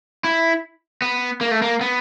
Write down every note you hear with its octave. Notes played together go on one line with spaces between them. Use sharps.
E4
B3
A#3
A3
A#3
B3